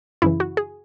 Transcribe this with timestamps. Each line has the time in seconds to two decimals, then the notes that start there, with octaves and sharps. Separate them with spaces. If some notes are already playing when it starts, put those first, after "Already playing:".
0.22 F#2 C#3 E3 E4
0.40 F#4
0.57 G#4